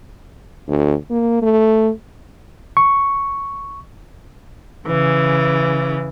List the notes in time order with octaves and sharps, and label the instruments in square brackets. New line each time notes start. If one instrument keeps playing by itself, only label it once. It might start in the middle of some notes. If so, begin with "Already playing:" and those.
[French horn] D2
A#3
A3
[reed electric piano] C#6
[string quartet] C#3 E3